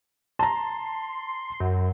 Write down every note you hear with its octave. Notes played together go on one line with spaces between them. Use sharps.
A5 A#5 C6
F#2